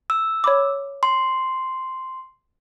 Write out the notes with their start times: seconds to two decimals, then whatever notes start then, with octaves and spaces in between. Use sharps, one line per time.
0.10 E6
0.44 C#5 B5 D6
1.03 C6